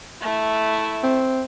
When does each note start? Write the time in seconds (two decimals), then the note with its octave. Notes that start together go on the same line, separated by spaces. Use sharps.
0.22 A3 E4
1.03 C4